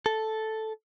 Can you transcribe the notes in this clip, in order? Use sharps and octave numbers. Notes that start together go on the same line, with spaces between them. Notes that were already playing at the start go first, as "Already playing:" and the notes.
A4